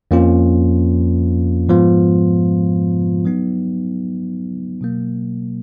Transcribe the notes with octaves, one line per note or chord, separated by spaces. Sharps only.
F2 F3 A#3 C#4 F4
G#2 F3 G#3 B3 F4
F#3 B3 D#4
B2 F#3 A#3